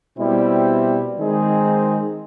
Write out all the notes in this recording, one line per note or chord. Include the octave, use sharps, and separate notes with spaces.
B2 G3 C4 E4
D#3 G#3 C4 D#4 G#4